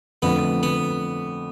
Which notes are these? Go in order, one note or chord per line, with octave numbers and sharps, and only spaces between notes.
F2 D3 A3 B3
B3